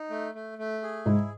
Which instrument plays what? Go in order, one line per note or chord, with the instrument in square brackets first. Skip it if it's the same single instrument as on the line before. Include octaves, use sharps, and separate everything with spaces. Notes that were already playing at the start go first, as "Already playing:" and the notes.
Already playing: [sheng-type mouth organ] D#4
A3
A3
A3
G#4
[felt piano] G#2 [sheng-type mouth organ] E4